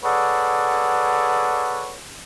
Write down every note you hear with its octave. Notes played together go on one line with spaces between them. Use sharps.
G#4 A4 B4 C#5 D5 F#5